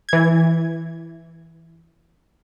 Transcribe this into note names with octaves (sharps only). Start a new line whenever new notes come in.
E3 G#6